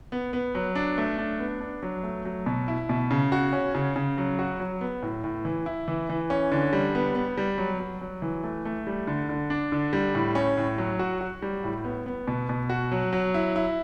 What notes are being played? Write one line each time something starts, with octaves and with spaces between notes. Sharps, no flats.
B3
B3
F#3
D4
A3
D4
B3
D4
F#3
A3
F#3
B2
E4
B2
C#3
F#4
C#4
C#3
C#3
F#3
F#4
F#3
B3
A2
A2
E3
E4
E3
E3
C#4
D3
G3
B3
B3
G3
F#3
F#3
F#3
E3
A3
A3
G3
D3
D3
D4
D3
G3
A2
C#4
A2
F#3
F#4
F#4
G3
A2
B3
B3
B2
B2
F#4
F#3
F#3
E4
E4